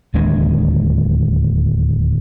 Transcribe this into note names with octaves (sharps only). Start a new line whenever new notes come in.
D1 D#2 G#3 D4